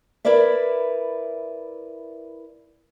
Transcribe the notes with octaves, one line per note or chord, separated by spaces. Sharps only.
E4 A#4 B4 D5 E5